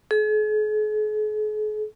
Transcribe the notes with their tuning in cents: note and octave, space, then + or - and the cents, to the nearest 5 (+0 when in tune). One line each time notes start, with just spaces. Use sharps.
G#4 +45